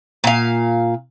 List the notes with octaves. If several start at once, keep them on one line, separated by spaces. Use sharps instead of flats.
A#2 F5